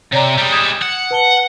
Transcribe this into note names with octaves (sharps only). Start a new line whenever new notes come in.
C3 C#5 D5 A#5
G3 G#3
D#6 G#6 E7
F#5
B4 A5 G7